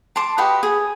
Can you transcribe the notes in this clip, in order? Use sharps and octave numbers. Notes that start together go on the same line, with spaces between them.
A5 C6 D6
F#4 G4 B4 D#5
G#4